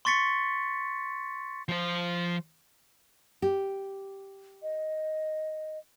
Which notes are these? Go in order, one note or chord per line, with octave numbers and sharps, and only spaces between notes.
C6 C#6 A6 B6 C#7
F3 C5
G4
D#5